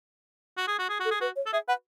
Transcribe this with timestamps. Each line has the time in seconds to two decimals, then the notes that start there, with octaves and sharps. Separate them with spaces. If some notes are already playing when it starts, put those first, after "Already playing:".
0.57 F#4
0.67 G#4
0.79 F#4
0.89 G#4
1.00 F#4
1.05 A4
1.11 G#4
1.21 F#4 B4
1.36 C#5
1.46 A4
1.53 G#4 E5
1.68 B4 F#5